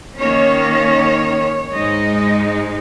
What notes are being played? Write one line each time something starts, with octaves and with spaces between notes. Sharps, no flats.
D#3 A#3 C#4 C#5
G#2 G#3 D#4 D#5